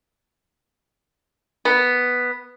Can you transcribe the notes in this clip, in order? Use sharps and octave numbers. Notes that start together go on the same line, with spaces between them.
B3